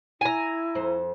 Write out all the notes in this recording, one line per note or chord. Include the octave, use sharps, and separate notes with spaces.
E4 G#5 A#5
F2 C5